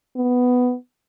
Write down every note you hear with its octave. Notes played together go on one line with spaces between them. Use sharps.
B3